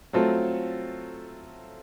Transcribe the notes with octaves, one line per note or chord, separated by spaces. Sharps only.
F#3 A3 C4 F4 A4